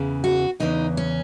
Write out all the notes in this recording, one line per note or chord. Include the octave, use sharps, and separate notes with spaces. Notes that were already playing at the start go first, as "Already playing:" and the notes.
Already playing: E2 C#3 E3
F#4
E2 C#3 E3 D#4
C#4